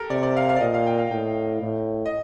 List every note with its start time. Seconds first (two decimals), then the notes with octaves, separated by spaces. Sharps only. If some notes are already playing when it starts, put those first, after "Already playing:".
Already playing: G4 A4 A#4
0.10 C3 D5
0.23 D5
0.37 F5
0.49 F5
0.56 D5
0.61 A#2 D#5
0.74 F5
0.86 G5
0.99 F5
1.11 A2 G5
1.62 A2
2.06 D#5